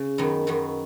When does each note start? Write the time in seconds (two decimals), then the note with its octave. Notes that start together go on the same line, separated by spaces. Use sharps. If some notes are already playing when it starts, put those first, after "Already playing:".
Already playing: C#3
0.18 F#2 D#3 F#3 B3
0.47 F#2 D#3 F#3 B3